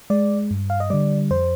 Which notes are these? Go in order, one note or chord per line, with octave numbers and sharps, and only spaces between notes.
G#3 D5
G2
F5
D#5
D3 G3 D5
F2 C5